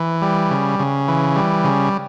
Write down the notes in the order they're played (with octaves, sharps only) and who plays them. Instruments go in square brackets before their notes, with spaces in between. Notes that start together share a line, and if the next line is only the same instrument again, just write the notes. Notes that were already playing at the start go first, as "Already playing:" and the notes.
Already playing: [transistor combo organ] E3
G3
C#3
C#3
E3
G3
C#3